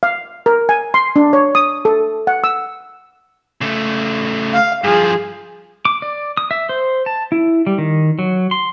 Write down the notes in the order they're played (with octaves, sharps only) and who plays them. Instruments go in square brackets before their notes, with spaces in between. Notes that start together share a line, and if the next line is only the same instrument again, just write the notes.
[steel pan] F5
A#4
G#5
C6
D4
C#5
D#6
A4
F#5
E6
[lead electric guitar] C#3 A3
[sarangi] F5
[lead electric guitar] G2 F3 [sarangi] G#4
[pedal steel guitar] D6
D5
D#6
E5
C5
A5
E4
G3
D#3
F#3
C6